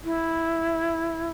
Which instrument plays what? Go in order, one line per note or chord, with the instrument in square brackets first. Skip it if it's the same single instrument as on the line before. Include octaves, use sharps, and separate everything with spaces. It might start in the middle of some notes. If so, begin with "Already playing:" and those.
[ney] E4